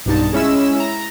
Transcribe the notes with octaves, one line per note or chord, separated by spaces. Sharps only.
B1 G2 D#4 A5
G#3 C#4 E4 E6
A#5